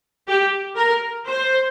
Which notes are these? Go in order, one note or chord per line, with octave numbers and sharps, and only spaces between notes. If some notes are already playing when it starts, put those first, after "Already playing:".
G4
A#4
C5